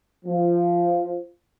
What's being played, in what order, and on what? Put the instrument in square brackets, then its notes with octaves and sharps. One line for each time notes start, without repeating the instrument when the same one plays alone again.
[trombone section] F3